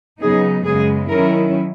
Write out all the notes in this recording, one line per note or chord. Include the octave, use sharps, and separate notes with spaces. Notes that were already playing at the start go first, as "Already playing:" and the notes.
C#3 F#3 B3 D#4 G#4
F#2 C#3 G#3 B3 G#4
D#3 F#3 C#4 E4 A#4